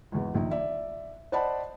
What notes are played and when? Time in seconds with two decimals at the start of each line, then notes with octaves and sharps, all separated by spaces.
0.12 G#1 E2
0.35 A#1 D#3
0.51 D5 E5
1.32 C5 D5 D#5 F#5 A5 B5